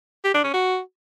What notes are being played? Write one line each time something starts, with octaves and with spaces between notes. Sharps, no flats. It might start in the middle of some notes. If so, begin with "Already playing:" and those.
G4
D4
C#4
F#4